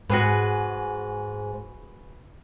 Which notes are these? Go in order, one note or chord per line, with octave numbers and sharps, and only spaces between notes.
G#2 F#4 G#4 B4